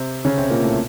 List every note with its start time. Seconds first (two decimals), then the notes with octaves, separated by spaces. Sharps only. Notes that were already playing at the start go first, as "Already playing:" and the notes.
Already playing: C3 C4
0.25 C#3 C#4
0.37 C3 C4
0.50 A#2 A#3
0.63 A2 A3